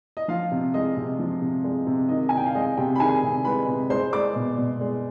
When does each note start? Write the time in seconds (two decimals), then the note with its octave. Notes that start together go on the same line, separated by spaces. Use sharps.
0.17 D#5
0.28 F3 F4 F5
0.51 C3
0.74 G#3 D#5
0.96 C3
1.19 F3
1.42 C3
1.64 G#3
1.87 C3
2.09 D#3 D#5
2.29 C3 G#5
2.38 G5
2.46 F5
2.55 G#3 D#5
2.77 C3 G4 G5
2.96 B5
2.99 D#3 G#4 G#5
3.23 C3
3.45 G#3 B4 B5
3.68 C3
3.90 G#3 C5 C6
4.13 G#3 D5 D6
4.35 B2
4.58 B2
4.81 G#3